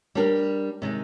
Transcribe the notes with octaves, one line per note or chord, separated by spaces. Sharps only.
G3 D4 G4 A#4
C3 D#3 G#3 D#4